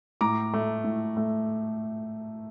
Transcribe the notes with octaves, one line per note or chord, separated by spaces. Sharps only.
A2 A#5 D6
A3
A2
A3